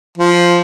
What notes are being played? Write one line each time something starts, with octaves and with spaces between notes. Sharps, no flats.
F3